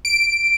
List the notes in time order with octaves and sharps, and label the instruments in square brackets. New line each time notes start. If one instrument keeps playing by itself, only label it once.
[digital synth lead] D7